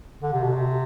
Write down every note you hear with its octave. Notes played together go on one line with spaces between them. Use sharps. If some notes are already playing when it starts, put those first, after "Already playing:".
D3
C3
B2
C3